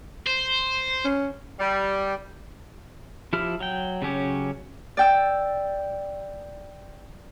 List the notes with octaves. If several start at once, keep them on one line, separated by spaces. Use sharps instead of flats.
C5
C#4
G3
F3 E4 G4 F6
F#3 G5
C#3 F#3 C#4 G4
D5 G5 E6